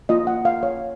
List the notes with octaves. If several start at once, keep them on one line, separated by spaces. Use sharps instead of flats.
A#3 F4 D#5
F#5
F5
C#5